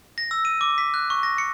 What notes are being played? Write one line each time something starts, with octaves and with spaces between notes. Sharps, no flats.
A#6
E6
D#7
D6
B6
F#6
C#6
A#6
C#7